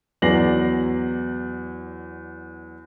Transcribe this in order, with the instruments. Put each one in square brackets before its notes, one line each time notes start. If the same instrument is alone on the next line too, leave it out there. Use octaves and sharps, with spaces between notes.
[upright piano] E2 F#3 D5 A#6 C7 F#7